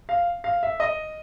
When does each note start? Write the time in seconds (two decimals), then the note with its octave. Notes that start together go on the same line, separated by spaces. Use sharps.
0.09 F5
0.44 F5
0.63 E5
0.80 D#5